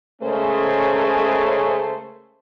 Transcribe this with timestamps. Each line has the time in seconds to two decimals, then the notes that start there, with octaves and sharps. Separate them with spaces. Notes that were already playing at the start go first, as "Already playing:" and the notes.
0.21 C#3 G#3 A3 C#4 A#4 C5